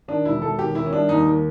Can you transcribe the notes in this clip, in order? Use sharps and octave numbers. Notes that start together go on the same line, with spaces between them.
D#3 D4
E1 E4
E1 A4
D#3 G4
D#3 E4
C#4
G3 D4
D#2 D#4
D#3